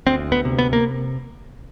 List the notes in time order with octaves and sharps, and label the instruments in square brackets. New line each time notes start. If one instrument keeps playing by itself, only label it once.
[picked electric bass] D2 C4
B3
C3
B3
A#3